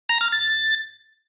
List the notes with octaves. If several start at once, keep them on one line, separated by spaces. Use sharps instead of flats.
A#5
F6
A6